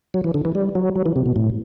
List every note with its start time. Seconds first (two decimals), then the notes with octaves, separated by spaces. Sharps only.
0.14 F#3
0.24 E3
0.34 D3
0.45 E3
0.55 G3
0.75 F#3
0.95 F#3
1.06 E3
1.16 C3
1.26 B2
1.36 A2